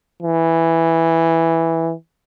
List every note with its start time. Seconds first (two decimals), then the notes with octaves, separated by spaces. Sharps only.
0.23 E3